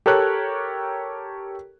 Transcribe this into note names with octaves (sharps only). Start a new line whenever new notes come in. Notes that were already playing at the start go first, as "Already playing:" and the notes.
G4 A4 A#4 C#5 F#6